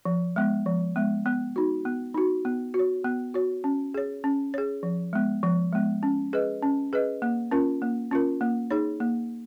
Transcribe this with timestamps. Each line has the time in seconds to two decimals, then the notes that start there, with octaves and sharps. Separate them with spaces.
0.05 F3
0.36 G#3 B3
0.66 F3
0.96 G#3 B3
1.26 B3
1.56 D#4 F#4
1.85 B3
2.14 D#4 F#4
2.45 B3
2.74 F#4
2.79 C#5
3.04 B3
3.34 F#4 C#5
3.64 C#4
3.94 G#4 C#5
4.24 C#4
4.54 G#4 C#5
4.83 F3
5.13 G#3 B3
5.43 F3
5.73 G#3 B3
6.03 C#4
6.33 G#4 B4 D#5
6.62 C#4
6.93 G#4 B4 D#5
7.22 A#3
7.51 C#4 F4 A#4
7.82 A#3
8.11 C#4 F4 A#4
8.41 A#3
8.70 D#4 G#4 C#5
9.00 A#3